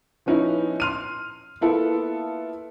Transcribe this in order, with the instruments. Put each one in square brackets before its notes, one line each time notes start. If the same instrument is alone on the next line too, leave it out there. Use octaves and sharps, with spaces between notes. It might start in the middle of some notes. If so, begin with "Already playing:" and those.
[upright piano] F3 B3 C#4 D#4 E4
C6 F6 D#7
A#3 B3 E4 F4 A4